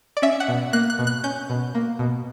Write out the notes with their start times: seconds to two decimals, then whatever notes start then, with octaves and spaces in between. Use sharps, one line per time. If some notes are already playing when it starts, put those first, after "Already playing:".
0.17 D5
0.22 C#4 E5
0.40 F#5
0.48 B2
0.73 A#3 F#6
0.90 F#6
0.99 B2
1.07 F#6
1.24 C#4 G6
1.50 B2
1.75 A#3
1.99 B2